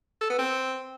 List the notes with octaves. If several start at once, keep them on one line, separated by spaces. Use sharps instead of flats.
A4
B3
C4